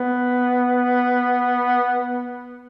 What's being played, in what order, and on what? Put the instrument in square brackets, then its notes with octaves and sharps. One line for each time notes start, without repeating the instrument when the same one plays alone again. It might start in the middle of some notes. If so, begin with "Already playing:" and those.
Already playing: [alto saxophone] B3